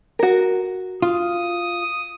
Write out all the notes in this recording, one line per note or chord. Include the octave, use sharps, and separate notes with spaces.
F#4 A#4
F4 D#6